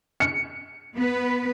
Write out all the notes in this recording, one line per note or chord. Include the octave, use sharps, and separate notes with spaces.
C#7
B3 B4